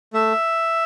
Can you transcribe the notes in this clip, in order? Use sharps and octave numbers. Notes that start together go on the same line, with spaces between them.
A3 E5